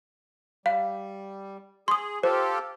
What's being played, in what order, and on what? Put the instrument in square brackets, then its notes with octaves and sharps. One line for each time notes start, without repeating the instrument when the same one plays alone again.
[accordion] G3 [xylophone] F5
[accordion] G#4 [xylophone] C6 D#6
[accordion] F4 G4 A4 [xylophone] C5